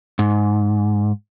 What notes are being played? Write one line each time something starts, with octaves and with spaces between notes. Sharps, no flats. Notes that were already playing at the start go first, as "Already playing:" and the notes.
G#2